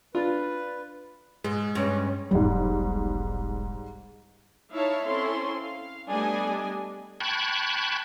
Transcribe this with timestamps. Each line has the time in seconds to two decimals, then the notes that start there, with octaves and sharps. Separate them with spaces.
0.15 D4 F4 B4
1.44 G#2 G#3
1.75 G2 C#4
2.31 E1 B1 G#2 G3
4.73 D#4 E4 C#5 E5 F5 A5
5.06 C4 C#4 E4 A4 C6
5.59 F5
6.08 G3 A3 B3 D4 D#5 G#5
7.20 G5 A5 B5 C#6 F#6 G#6